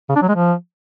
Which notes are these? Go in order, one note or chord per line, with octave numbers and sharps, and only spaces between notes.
C#3
D4
F#3
G#3
F3